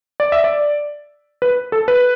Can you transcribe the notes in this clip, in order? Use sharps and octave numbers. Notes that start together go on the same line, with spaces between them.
D5
E5
D5
B4
A4
B4